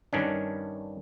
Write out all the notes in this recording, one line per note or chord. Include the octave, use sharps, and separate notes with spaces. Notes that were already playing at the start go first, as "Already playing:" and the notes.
G2 D#3 C#4 D4